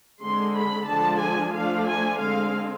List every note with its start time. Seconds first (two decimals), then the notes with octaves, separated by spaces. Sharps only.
0.23 D3 G#3 C4 C6
0.56 B5
0.89 D3 F3 G#3 D4 A5
1.23 G#5
1.55 F3 A3 D4 F5
1.89 G#5
2.21 D3 G#3 C4 F5